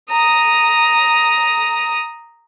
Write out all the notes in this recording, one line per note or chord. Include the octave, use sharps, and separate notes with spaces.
A#5 D#6